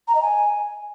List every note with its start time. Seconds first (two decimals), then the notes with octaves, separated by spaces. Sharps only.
0.08 A#5
0.15 D#5
0.22 G#5